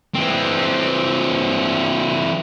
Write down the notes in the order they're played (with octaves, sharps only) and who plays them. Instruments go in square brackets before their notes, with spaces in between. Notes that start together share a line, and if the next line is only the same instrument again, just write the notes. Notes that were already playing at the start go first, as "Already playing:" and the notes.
[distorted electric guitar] E3 C4